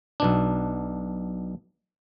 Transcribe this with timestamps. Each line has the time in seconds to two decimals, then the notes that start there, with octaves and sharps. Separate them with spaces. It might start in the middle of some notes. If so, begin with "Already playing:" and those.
0.20 B1 B2 D4